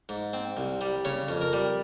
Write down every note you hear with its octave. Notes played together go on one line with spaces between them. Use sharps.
G#2
C4
C2
G3
C#3 C#5
F2
A#4
G3